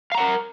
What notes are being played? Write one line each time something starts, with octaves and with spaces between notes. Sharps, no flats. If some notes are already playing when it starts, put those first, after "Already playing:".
A#4 F5 F#5 A#5